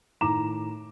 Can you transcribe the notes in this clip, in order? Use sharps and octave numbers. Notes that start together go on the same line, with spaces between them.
A2 D#3 A#5 D6 E7